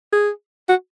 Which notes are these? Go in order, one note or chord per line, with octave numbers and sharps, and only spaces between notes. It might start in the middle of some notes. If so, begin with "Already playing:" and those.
G#4
F#4